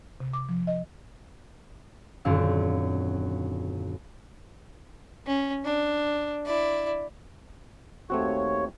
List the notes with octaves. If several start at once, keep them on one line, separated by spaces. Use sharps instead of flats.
C3
D6
F3
D#5
D#1 F#2 D3 C4 F5 E6
C#4
D4
E4 D5
D#2 A3 C4 F#4 C#5